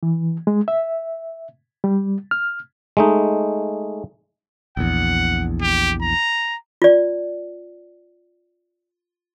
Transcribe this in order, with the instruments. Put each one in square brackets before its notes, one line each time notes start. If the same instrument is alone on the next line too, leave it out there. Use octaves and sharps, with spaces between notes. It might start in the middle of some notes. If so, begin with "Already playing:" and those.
[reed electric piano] E3
G#3
E5
G3
F6
[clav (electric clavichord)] G#3 A3 D#4
[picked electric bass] A#1 E2 [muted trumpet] F#5
[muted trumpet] G4
A#5
[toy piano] F4 D5